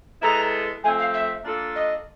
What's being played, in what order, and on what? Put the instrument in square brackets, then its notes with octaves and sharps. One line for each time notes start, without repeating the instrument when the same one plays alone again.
[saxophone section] G#3 B3 E4 A4 [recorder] A#5
[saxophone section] F3 A3 C4 [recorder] G#5
[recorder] F5
E5
[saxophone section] A#3 D4 F4 A4
[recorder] D#5